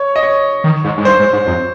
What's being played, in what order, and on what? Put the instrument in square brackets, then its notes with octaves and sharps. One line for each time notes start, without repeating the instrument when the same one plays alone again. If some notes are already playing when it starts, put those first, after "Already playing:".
Already playing: [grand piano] C#5
D#5
C#5
[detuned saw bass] D#3
G#2
G#2
[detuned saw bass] G2 [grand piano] C5
[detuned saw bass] G#2
G#2
F2